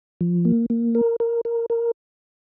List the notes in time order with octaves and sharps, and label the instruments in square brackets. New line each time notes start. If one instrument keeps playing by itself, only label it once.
[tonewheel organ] F3
A#3
A#3
A#4
A#4
A#4
A#4